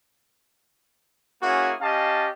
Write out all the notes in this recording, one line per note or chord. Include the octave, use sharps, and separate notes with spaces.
A#3 C#4 E4 F#4 G#4
C#4 G4 D#5 F5 A5